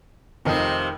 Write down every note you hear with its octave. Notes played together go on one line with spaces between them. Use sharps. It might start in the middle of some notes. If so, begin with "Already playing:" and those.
F1 C3 D#3 F3 D#4